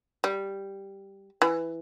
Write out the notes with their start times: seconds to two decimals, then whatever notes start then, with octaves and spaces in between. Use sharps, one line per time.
0.24 G3
1.42 E3